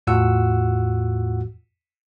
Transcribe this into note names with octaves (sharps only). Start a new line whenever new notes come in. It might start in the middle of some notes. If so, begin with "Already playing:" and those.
E2 A2 F4 F#4 F#5 E6